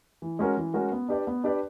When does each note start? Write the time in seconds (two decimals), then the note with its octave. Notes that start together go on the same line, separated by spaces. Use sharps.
0.22 E3
0.39 G#3 C#4 F#4 A#4
0.57 E3
0.74 G#3 C#4 F#4 A#4
0.92 B3
1.09 D4 G4 B4 D5
1.27 B3
1.44 D4 G4 B4 D5